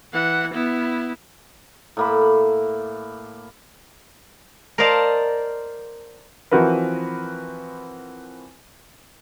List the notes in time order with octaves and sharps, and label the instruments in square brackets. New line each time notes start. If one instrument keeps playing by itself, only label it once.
[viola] E3 F#5
B3 E4
[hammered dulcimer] A2 A#3 B5
[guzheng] A#4 C5 D5 D#5 F5 A5
[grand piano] E3 F3 C4 F#4 A#4 B4